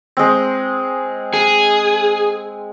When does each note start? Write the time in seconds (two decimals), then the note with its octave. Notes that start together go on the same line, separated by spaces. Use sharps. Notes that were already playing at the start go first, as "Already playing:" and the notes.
0.17 G#3 C4
1.34 G#4